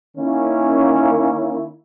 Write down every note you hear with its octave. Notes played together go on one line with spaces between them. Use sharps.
D#3 A#3 C#4 E4